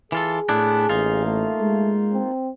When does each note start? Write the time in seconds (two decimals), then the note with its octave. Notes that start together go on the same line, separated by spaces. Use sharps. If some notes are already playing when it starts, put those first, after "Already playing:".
0.12 E3 F4 G#4 A4
0.49 A2 B3 D4 E4
0.89 A1 A#3 D#4 F4
1.26 A3
1.60 G#3
2.13 C4